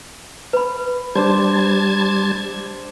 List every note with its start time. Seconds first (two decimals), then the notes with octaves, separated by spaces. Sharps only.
0.53 B4 B5
1.16 G3 D4 C5 A5 G#6